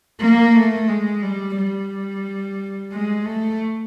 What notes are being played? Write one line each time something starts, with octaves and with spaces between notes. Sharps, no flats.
A#3
A3
G#3
G3
G3
G#3
A3